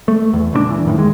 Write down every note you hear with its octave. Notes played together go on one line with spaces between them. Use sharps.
A3
E2
C#2 A#2 A3 D4
E3
F#2 A2 D#3
D#2 G#3